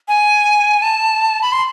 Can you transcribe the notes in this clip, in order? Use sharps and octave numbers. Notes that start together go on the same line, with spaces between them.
G#5
A5
B5
C6